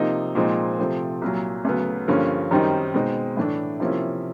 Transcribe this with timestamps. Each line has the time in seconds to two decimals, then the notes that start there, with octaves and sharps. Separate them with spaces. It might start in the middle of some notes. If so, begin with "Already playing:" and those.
Already playing: C3 F3 A#3 D#4
0.35 A#2 F3 G#3 C4 D#4
0.79 C3 F3 A3 C4
1.22 C2 A#2 F#3
1.65 D2 C#3 F#3 B3
2.08 G2 D3 F3 A#3 C#4
2.51 F#2 D#3 G3 C4 D#4
2.94 B2 G#3 C4 D#4
3.37 A2 E3 A3 D4
3.80 C3 F3 A#3 C#4 E4